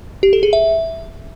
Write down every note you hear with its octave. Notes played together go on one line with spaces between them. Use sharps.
G4
A4
G#4
E5